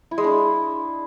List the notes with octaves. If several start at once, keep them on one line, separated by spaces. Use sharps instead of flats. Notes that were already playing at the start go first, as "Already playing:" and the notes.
E4
G#3
D4